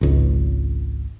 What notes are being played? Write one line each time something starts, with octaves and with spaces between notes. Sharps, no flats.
G#1 C#2